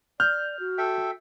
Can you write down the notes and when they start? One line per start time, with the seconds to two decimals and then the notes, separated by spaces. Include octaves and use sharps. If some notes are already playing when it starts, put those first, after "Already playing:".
0.20 D5 F6 G6
0.60 F#4
0.78 A4 E5 G5